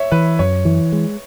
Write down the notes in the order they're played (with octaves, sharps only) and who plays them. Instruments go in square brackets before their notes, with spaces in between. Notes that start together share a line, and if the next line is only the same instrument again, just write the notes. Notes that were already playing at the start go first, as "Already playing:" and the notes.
Already playing: [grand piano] C#5 E5
[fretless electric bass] E3 [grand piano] B4
[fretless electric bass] F#2 [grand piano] C#5
[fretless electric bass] E3
G#3